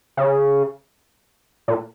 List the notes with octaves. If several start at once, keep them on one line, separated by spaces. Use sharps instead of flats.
C#3
A#2